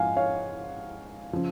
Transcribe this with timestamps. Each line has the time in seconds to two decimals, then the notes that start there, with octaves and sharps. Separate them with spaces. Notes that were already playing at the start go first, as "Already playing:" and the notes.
Already playing: G#2 F3 F5 F#5 G#5
0.17 C#5 F5
1.33 C#3 F3